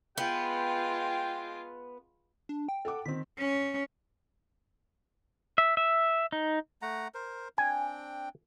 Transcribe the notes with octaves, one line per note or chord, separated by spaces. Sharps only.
G#3 B3 F4 G5
D4
G5
A4 F#5 D6
D#3 C4 B6
C#4
E5
E5
D#4
A3 F#5 A#5
A#4 C5
C4 D4 G5 G#5